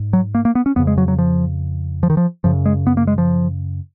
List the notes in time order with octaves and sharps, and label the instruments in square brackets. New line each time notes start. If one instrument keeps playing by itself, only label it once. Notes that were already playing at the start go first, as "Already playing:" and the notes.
Already playing: [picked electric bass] G#2
F#3
A#3
A#3
B3
C#4
F2 C#3 B3
G#3
F#3
F#3
F3
F3
D#3
F3
F#2 C#3 F3
G#3
B3
A#3
G#3
F3